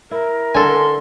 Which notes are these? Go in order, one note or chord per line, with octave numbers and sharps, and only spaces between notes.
E4 A#4
D3 D4 A4 G#5 C6